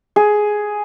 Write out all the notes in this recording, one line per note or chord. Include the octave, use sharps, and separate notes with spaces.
G#4